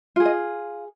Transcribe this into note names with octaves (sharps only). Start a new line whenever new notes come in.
F4 G#4 F5
D#5